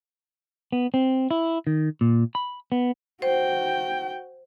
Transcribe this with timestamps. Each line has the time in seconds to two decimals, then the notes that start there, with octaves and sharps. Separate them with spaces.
0.72 B3
0.94 C4
1.31 E4
1.67 D#3
2.01 A#2
2.35 B5
2.72 B3
3.22 F#4 C5 G5